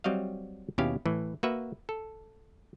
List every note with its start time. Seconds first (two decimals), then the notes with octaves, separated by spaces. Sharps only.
0.04 F#3 G3 C4 F#4 D#5 F5
0.78 D#2 B2 C#4 E4 G4 F5
1.06 A2 E3
1.43 A#3 F#4 B4 E5
1.89 A4